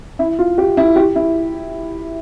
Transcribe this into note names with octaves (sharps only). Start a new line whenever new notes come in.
E4
F4
G4
E4
G4
E4